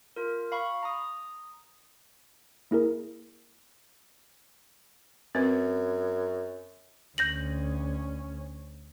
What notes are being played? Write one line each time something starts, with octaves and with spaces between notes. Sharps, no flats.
F4 A#4
F5 B5 C#6
A#5 D#6
A#3 E4 G#4 A#4
F#2 C4 B4
D2 C#4 G6 A#6 F#7